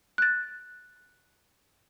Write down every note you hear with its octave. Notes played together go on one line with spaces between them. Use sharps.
F#6 A6